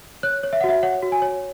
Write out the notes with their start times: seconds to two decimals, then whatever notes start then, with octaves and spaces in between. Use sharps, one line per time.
0.23 C#5 F#6
0.43 C#5
0.53 E5
0.61 F#5
0.64 F#4 E5
0.83 C#5 F#5
1.02 F#4
1.12 G#5
1.22 C#5